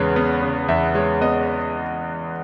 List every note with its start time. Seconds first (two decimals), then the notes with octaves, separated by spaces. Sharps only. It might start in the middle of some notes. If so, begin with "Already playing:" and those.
Already playing: E2 C#3 G#3 B4 C#5
0.16 B3
0.42 C#3
0.68 E2 E5
0.95 G#3 C#5
1.21 B3 D#5